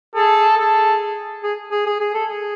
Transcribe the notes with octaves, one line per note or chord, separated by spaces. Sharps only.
G#4 A4
G#4 A4
G#4
G#4
G#4
G#4
A4
G#4